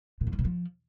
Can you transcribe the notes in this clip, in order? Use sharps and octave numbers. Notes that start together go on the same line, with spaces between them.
A#2
F2
G3
B2
F3